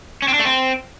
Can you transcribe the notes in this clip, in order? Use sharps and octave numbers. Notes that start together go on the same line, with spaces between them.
C#4
C4
D4
A3
C4